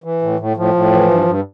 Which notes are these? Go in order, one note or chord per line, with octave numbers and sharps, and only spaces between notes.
E3
A2
A2
A2 F3
A2
E3
G2
G2